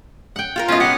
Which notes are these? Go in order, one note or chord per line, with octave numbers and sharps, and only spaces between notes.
F#5 G5
F4 G4 A#4
B2 B3 C#4 F4 D#5
G4 F5 F#5